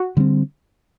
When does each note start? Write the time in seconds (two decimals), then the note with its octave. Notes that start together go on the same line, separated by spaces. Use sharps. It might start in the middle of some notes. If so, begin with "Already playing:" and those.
Already playing: F#4
0.17 D3 G3 C4